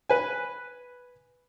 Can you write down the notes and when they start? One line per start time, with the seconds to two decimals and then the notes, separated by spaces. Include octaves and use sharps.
0.10 B4 G#5